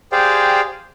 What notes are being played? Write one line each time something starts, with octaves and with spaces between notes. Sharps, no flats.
G4 G#4 C5 D5 F5 G5